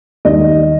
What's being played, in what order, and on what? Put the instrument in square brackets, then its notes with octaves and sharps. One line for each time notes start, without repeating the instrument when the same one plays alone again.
[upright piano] D#2 D#3 G3 D#5